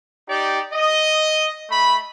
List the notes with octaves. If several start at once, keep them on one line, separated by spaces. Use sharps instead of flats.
D#4 G4 D5
D#5
A3 B5